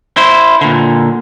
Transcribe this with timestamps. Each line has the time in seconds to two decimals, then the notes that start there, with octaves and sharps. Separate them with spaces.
0.17 E4 C5
0.61 A#2 D3